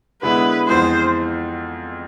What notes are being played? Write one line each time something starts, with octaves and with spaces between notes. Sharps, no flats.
D3 G#3 B3 E4 B4
F2 E3 G#3 B3 C5